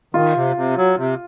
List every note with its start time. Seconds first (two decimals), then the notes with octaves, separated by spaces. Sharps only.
0.14 D#3 F4
0.35 C3
0.56 C3
0.77 F#3
0.97 C3